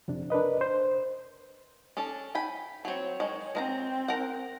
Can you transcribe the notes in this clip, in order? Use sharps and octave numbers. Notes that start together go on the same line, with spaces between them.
F2 C3 D4
D4 A#4 B4 D#5
C5
C#4 D4 A4
G5 G#5 B5
F#3 C4 C#5
D#3 G#3
G#3 C4 A#4 A#5
A#4 F#5